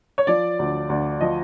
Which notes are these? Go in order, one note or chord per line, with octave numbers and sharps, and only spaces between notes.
C#5
F3 D5
D2
D2
F3 D#5